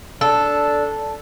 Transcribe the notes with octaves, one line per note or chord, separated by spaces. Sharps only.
D4 A4